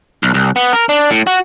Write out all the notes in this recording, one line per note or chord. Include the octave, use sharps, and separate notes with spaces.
B1
C2
B3
A#4
D4
A2
F#4